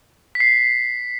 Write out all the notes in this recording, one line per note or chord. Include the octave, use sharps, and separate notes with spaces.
B6
C7